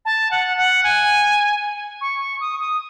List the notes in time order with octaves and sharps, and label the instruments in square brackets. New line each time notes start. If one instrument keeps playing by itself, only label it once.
[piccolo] A5
F#5
F#5
G#5
C#6
D#6
D#6